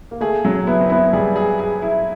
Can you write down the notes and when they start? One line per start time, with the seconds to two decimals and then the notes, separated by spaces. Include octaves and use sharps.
0.11 A#3
0.21 A3 G#4
0.45 F#3
0.67 B3 E4
0.80 C4
0.90 B3 E4
1.13 G3 G#4
1.36 G#4
1.59 G#4
1.82 E4